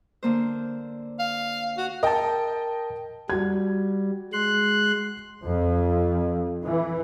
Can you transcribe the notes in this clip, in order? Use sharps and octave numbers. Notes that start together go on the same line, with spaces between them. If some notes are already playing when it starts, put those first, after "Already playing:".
D3 A#3 C5
F5
F#4
A#4 D#5 G5 A5
G3 F#4 G#6
G#3 C6 F#6
F2
E3